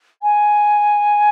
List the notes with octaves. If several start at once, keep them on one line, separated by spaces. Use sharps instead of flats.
G#5